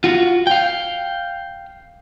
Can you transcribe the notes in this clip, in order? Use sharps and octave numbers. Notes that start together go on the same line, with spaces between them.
F4 F#4
F5 G5